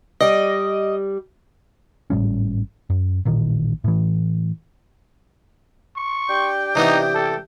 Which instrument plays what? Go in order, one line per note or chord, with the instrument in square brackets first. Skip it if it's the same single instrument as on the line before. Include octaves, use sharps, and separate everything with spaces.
[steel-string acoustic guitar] G3 D5 [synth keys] D#5
[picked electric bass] G#1 A2 G3 C#4
F#2
A1 A#2 D#3
A2 E3
[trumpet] C#6
[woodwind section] D4 G4 G5
[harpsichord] C3 E3 B3 [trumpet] D#4
[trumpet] A4